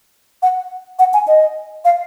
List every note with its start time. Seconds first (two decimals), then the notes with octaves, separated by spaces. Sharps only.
0.42 F#5
0.99 F#5
1.14 G#5
1.27 D#5
1.85 F5